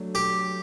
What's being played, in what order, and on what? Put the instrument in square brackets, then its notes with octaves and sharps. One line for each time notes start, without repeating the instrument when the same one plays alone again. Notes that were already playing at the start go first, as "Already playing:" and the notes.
Already playing: [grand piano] F#3 A3 D4
[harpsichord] G4